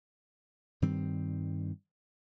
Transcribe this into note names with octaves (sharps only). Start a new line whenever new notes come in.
G2 D#3 G3 C4